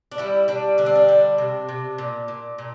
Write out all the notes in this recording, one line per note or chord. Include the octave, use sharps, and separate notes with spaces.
D4
G3 E4
G3 D4
D3 D4
C4
D4
G3
C3
C3
A#2
A#2
A#2